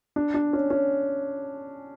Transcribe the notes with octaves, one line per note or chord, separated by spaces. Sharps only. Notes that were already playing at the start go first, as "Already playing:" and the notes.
D4
D4
C#4
C#4